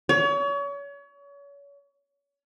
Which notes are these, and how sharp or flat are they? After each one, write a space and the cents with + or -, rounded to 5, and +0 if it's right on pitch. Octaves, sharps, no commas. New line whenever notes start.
C#5 +35